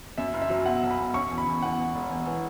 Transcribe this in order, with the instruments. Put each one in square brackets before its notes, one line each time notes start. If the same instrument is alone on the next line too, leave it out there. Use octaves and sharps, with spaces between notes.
[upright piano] F#2 [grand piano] E5
[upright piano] F#1
[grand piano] E5
[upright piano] F#3
[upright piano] B2 [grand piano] F#5
[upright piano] B1
[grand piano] B5
[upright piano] B2
[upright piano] C#4 [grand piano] C#6
[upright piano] E2
[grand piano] B5
[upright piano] E2
[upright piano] E2 [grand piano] F#5
[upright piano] E2
E1
E2
E3